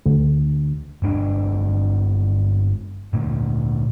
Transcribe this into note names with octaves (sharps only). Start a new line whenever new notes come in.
D2
G1 G#3 D4
D2 A#2